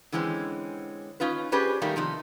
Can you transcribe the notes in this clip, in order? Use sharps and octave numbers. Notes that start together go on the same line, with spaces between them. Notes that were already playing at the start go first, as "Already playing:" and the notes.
D3 E3 G#3 C4 C#4
C#4 D#4 F4 B4
C#4 G4 G#4 B4 C5 D5
D#3 G3 A3 A#3
C3 F3 D#4